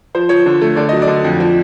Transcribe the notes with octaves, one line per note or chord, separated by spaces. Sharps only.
F3 C5
F3 C#5
D3
A3
D3 D5
F#3 D#5
D5
D3
F2
F3